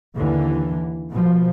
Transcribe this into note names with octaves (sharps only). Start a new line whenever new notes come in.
D#2 D3 E3
B2 F3